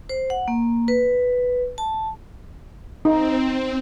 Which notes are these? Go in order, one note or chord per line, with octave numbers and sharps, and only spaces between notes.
C5
F#5
A#3
B4
A5
C4 D#4